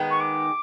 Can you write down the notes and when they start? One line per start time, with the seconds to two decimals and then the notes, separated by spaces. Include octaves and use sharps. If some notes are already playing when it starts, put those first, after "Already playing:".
Already playing: D#3 G#3 B3
0.10 C#6
0.20 D6